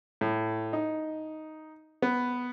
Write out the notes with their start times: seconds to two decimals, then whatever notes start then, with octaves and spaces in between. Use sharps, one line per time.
0.21 A2
0.73 D#4
2.02 B3